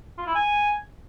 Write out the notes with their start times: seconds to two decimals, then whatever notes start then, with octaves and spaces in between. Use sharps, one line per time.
0.18 F4
0.26 E4
0.35 G#5